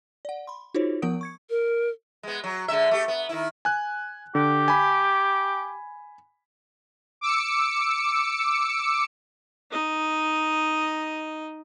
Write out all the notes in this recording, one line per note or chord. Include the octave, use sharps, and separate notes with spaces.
D5 F#5
B5 C6
D#4 F4 F#4 G#4 C5 C#5
F3 B3 A#4 F#5 D#6 D7
C#6 G#6 C#7
A#4
G#3 B3
F#3
D3 G#3 E5
A3 G4
B3
D#3 E4
G#5 F#6
D3 G4
G#5 B5
D6 E6 C#7
D#4 D#5